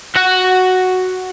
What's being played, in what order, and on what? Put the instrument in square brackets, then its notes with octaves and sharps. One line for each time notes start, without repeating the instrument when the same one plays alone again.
[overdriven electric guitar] F#4 F#5